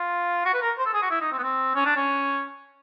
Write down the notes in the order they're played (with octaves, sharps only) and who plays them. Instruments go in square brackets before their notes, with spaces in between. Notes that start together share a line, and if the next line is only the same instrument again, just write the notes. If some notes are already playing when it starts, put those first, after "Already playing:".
Already playing: [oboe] F4
F#4
B4
A#4
C5
A4
G#4
F#4
E4
D#4
C4
B3
C4
C#4
D4
C#4